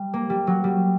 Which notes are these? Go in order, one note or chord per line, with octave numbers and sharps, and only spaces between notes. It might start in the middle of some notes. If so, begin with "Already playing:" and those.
Already playing: G3
A#3
G3
F#3
G3